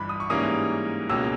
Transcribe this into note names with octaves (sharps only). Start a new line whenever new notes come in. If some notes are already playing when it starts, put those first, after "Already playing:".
Already playing: G1 G2 E3 B5
D#6
C#6
G#2 E3 G3 A#3 C#4 D#6
C#2 B2 A#3 C#4 E6